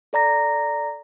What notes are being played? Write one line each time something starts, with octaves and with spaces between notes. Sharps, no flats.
A4 D5 A#5 A#6